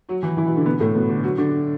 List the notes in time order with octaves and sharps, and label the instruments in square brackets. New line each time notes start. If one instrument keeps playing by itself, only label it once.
[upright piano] F#3 F#4
E3 E4
E3 E4
B2 B3
D3 D4
B2 B3
A2 A3
B2 B3
D3 D4
F#3 F#4
D3 D4